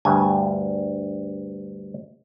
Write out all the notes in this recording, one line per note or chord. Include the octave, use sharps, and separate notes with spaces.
D2 G2 G#5